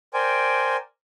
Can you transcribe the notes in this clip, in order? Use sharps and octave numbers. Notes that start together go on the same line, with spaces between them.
A#4 C5 D5 G5 G#5